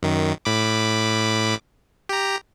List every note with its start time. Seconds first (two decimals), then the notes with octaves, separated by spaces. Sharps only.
0.03 F#2 D#3
0.45 A2 B5 D6
2.09 G4 A#5